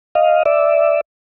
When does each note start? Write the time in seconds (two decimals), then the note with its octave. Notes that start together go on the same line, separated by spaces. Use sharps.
0.15 D#5 F5
0.45 D5 E5